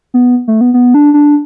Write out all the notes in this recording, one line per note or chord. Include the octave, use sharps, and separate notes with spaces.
B3
A3
B3
B3
D4
D4